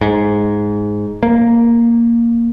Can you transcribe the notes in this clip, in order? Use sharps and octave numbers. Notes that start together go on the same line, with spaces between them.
G#2
A#3